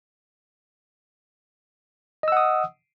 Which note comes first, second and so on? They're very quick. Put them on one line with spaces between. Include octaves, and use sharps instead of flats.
D#5 E6 F#5 D#6